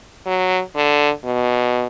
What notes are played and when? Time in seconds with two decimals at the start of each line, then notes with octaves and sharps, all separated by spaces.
0.26 F#3
0.76 D3
1.25 B2